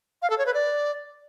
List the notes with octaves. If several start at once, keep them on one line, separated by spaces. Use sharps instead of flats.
F5
A4
C#5
B4
D5